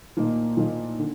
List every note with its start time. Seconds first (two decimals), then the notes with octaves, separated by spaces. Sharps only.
0.17 A#2 F3 A#3 D#4
0.57 A#2 F3 A#3 D#4
0.99 D3